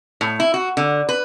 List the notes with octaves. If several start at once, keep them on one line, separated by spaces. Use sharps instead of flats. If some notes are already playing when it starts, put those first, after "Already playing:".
A2
E4
F#4
D3
B4